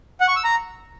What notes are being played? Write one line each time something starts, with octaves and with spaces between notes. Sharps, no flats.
F#5
C#6
E6
A#5